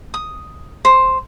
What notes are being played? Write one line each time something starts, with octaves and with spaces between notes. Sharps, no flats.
D#6
C5